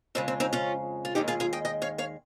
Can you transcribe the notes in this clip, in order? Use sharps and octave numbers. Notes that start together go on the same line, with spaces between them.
F2 C#3 G#3 C4
C4
C4 D#4
C#4 F4
F4
D#2 D#3 G#3 D#4 G4
F4 G#4
F4 G#4
D#5 G5
D#5 G5
C#5 F5
C#5 F5